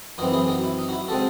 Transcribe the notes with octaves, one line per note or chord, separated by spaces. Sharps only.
F#2 E3 C4 D#4 F#4
E4 G#4
D#4 F#4
E4
D#4
F#4
E4
C#3 G#3 C4 F#4 A4